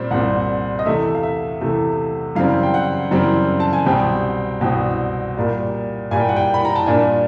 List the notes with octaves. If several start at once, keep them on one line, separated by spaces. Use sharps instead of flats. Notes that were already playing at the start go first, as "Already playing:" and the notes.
Already playing: A#2 G3 C4
C2 A#2 G3 C4 F#5
D#5
E2 C3 E3 A3 E5
F5
E5
E2 C3 E3 A3
F#2 C#3 E3 G3 C4 F5
G5
F#5
F#2 C#3 E3 G3 C4
A5
G#5
C2 B2 G3 C4 G5
C2 B2 G3 C4 G5
A#2 G3 A#3
A#2 G3 A#3 G#5
G5
F#5
G5
B5
A#5
A5
A#2 G3 A#3 D4 G#5